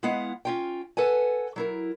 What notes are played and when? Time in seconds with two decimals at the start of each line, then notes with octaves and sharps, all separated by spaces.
0.03 G#3 B3 E4 F5 F#5
0.45 C#4 F4 G5
0.97 A4 B4 F#5 G#5
1.56 F#3 E4 A#4